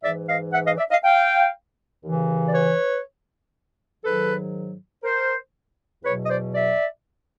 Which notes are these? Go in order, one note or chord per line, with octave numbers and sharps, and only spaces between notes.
G#2 E3 D5 E5
D#5 F5
E5 F#5
D#5 F5
D5 E5
D#5 F5
F5 G5
D#2 C#3 E3
D5
B4 C#5
G#2 D#3 F#3 A4 B4
A#4 C5
E2 B2 F#3 B4 C#5
D#5
C5 D5
D5 E5